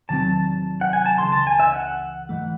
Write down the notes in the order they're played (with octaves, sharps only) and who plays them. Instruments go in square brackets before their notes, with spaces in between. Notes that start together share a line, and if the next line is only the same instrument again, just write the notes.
[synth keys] E2 C3 D#3 F#3 C4 [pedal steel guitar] A5
[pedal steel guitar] F#5
G#5
A5
[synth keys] C#2 C#3 E3 [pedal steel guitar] C6
[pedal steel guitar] A5
G#5
E5
F#5
[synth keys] G#2 E3 A3